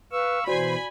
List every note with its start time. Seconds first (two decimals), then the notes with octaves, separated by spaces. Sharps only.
0.12 B4 F5 C#6 E6
0.47 B2 E3 F#4 C5 D5 G#5 B5